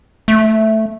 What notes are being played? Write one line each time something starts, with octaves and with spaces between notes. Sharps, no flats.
A3